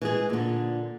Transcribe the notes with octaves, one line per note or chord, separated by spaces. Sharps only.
E3 G#3 G#4
A#2 D3